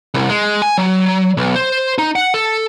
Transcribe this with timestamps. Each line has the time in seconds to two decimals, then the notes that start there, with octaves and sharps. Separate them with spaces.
0.14 C2
0.29 G#3
0.62 G#5
0.78 F#3
1.37 B1
1.56 C5
1.98 D#4
2.16 F#5
2.34 A4